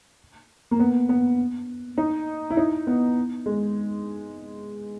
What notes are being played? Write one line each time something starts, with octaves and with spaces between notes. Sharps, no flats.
A#3
B3
B3
D#4
E4
D#4
B3
G#3